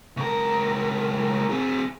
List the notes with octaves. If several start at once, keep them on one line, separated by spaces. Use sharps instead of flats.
C#2 A#4
C4 G#4